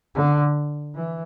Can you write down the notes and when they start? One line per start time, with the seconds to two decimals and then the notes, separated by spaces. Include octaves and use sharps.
0.15 D3
0.95 E3